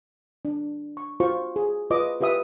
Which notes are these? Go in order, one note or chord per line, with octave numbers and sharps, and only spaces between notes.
D4
C#6
F4 F#4 C5 C#6
G#4
F4 B4 D#5 D6
F4 G4 B4 E5 D#6